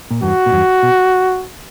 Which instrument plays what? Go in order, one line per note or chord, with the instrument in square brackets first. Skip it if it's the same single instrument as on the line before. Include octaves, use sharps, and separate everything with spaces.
[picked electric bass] A#2
[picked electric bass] E2 G2 [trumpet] F#4
[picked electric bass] A#2
E2 G2
B2